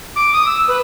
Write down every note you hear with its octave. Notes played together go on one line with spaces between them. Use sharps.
D6
D#6
E6
B4